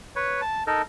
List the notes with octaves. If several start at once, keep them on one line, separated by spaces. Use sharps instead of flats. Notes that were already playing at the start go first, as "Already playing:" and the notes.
B4 C#5
A5
D#4 A4 A#4